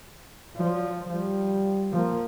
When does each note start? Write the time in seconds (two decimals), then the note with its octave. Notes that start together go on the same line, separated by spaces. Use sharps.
0.57 F3 F#3 D5
1.10 F3 G3
1.92 F3 A#3